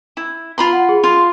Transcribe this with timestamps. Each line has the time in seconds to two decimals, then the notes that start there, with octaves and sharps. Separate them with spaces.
0.17 E4
0.58 F4 B5 C6
0.73 F#5
0.89 G#4
1.04 F4 F5 C6